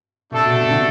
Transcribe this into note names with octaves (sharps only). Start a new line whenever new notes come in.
C3 A3 D4 A4
B2
C3
C3
D3